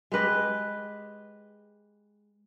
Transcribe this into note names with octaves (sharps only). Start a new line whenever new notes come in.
G#3 G4 B4 D#5